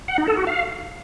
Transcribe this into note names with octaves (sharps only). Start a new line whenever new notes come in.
F#5
D#4
A4
F#4
F5